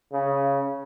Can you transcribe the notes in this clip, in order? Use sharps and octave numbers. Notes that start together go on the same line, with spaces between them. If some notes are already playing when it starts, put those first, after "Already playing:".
C#3